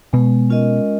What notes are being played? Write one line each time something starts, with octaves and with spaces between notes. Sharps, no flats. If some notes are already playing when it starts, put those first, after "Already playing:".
B2 G#3 B3
C#4 F4 A#4 D#5